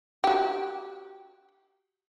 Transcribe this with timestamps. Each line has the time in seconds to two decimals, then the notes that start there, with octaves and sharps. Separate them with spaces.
0.24 F#4 G4